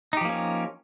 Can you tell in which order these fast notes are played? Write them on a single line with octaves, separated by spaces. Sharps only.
D#4 G4 F3 A#3 C#4